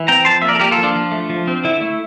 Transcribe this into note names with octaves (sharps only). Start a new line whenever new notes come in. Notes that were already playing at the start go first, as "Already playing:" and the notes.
Already playing: E3
C4 G5 A#5
F3 A5 C6
A#3 E5
A#4 D5
A4
A#3 G4 A#4
F4 A4
F3
D4 F4
F3
A3
F3
C4
D3 E4
A3